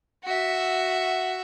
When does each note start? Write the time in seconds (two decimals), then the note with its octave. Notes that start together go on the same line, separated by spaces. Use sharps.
0.24 F#4 E5